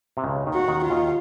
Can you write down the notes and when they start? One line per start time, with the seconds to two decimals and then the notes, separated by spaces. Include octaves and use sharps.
0.17 C3
0.24 C#2 C#3
0.46 D#2 D#3
0.54 F#4
0.68 D#2 D#3
0.83 F4
0.90 D#2 D#3